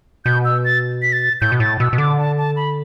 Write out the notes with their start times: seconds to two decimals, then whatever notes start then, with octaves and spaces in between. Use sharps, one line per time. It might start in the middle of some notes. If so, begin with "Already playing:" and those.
0.25 B2 G6
0.45 E6
0.65 A6
1.02 B6
1.13 A6
1.41 A2 G6
1.52 B2
1.60 A2 A6
1.80 B2 E6
1.93 B2
1.98 D3 D6
2.18 A5
2.38 A5
2.56 B5